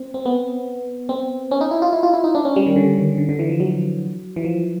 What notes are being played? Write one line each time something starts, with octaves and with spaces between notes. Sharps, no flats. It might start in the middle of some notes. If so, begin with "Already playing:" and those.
Already playing: C4
C4
B3
C4
C#4
D#4
E4
F4
E4
F4
E4
D#4
D4
C#4
G3
D#3
D3
D#3
D3
D3
E3
F3
F#3
E3
F3